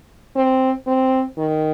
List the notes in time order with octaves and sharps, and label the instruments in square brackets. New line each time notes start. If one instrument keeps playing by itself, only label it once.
[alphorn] C4
C4
D#3